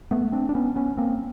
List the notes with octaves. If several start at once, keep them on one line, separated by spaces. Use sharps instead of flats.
A3 B3
C4 D4
D4
B3 C#4
B3 C#4
A#3 C4